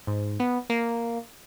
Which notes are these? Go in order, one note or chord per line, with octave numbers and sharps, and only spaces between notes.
G#2
B3
A#3